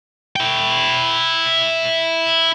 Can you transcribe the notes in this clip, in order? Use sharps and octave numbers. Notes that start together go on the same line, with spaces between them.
E4 G5